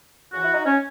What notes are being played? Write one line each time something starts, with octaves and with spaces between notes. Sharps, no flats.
C#3 E3 F#4
E4
D#4
C#4